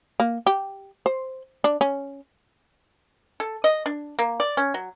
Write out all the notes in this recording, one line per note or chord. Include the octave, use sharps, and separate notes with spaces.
A#3
G4
C5
D4
C#4
A4
D#5
D4
A#3
D5
C#4
F#3